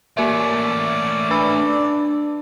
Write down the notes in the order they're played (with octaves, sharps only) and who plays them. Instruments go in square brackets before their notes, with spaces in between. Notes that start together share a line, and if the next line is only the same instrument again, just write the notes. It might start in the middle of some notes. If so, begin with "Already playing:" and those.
[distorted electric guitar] A3 C#4 [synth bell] A#3 A#4 E5 [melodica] D5
[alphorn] D4 [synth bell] B4 B5 E6